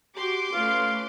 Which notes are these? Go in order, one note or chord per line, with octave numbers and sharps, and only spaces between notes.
F#4 G4 C6 D6
A3 C#4 F4 B4